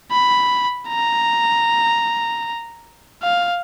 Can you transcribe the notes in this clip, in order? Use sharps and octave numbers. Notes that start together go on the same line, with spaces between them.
B5
A#5
F5